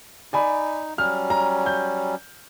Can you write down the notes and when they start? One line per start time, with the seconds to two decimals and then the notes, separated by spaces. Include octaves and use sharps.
0.33 D#4 D5 G#5 B5
0.98 F#3 G3 C#4 F6
1.30 A#5
1.66 G6